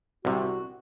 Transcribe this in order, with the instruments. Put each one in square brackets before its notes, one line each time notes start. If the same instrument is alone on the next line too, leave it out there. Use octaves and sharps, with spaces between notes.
[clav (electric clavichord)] C2 C3 [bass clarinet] F#4